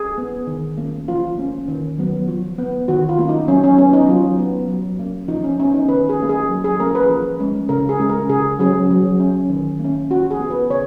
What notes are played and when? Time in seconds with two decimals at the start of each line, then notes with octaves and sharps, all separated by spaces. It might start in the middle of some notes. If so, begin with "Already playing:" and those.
Already playing: G#4
0.18 B3
0.47 D#3
0.78 A#3 C#4
1.08 F3 F4
1.38 A#3 C#4
1.68 D#3
1.98 F#3 B3
2.28 F3
2.58 B3
2.88 D#3 F#4
3.09 F4
3.19 A#3 C#4
3.29 D#4
3.48 F#3 C#4
3.64 C#4
3.78 B3 C#4
3.93 D#4
4.09 F#3 F4
4.38 B3
4.68 F#3
4.99 A#3 C#4
5.28 F3 D#4
5.44 C#4
5.60 B3 C#4
5.74 D#4
5.89 D#3 B4
6.09 G#4
6.19 A#3 C#4
6.29 G#4
6.49 F#3
6.64 G#4
6.80 A#3 C#4 A#4
6.95 B4
7.10 F3
7.40 G#3 C#4
7.69 C#3 A#4
7.89 G#4
7.99 G#3 C#4
8.09 A#4
8.29 C#3 G#4
8.59 F#3 C#4 G#4
8.90 F#3
9.20 C#4
9.50 D#3
9.80 A#3 C#4
10.10 F3 F#4
10.31 G#4
10.40 B3
10.50 B4
10.70 C#3 C#5